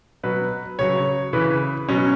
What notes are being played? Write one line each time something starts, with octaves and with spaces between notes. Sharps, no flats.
B2 F#3 B4
C#3 F#3 C#5
C#3 E3 B4
B2 F#3 C#4